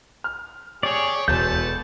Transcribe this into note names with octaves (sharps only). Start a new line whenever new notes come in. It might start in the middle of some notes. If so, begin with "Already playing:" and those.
F6
G4 G#4 C#5 D5
E1 A4 B4 A5 G6